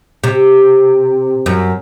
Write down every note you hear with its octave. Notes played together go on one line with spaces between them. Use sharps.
C3
F#2